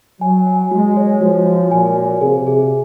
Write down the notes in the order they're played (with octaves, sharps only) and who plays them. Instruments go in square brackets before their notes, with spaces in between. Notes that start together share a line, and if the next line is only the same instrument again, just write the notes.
[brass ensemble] F#3 [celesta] G#5
[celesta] G#5
[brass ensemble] G#3 [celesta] F#4
[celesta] C#5
[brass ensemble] F3 [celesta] F#4
[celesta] F#4
[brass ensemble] A#2 [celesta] G#5
[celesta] F#4
[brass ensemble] C3 [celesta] G#4
[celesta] G#4